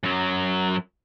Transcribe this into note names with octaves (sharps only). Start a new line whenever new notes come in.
F#2 F#3